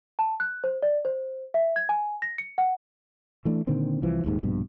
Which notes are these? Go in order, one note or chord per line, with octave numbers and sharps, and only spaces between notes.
A5
F#6
C5
D5
C5
E5
G#6
G#5
A#6
C#7
F#5
E3 A3 D4
A#2 D3 D#3 C4
C2 E3 F3
D#1 D#2 G#2
A#1 G2 B2